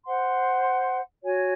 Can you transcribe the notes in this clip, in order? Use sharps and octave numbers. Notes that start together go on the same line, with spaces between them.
C5 F#5 C6
F#4 C#5 G#5